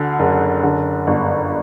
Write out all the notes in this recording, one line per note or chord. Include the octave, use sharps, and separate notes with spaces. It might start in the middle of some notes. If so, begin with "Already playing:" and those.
Already playing: D2 D3
F#1
D3
G1